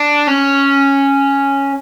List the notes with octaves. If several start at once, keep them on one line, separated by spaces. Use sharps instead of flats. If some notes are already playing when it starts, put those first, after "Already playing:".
Already playing: D4
C#4